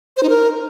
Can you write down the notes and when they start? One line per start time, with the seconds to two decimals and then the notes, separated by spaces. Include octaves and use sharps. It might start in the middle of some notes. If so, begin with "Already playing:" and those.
0.17 C5
0.23 D#4
0.29 A#4